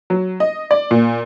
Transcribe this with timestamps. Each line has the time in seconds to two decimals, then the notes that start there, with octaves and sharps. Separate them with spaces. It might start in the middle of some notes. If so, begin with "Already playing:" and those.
0.10 F#3
0.40 D#5
0.71 D5
0.91 A#2